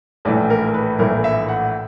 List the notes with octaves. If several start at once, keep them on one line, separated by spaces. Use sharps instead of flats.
A#1 A2 E3 A3 D5
A#4
B4
A#1 A2 E3 A3 A#4
E5
F#5